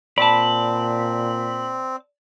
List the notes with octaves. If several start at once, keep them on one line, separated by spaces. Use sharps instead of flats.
A#2 C4 D5 A5 B5